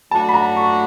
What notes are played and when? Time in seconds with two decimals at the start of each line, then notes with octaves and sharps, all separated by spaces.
0.11 F#3 A3 D4 F#4 A5
0.29 B5
0.34 A#5
0.56 C#6